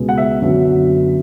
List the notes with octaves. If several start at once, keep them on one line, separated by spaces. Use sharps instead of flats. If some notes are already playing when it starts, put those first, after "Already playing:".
Already playing: C#2 B2 G#3 B3
F#5
E5
F#2 D3 F#3 B3